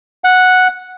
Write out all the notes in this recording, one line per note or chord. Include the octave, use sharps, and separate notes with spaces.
F#5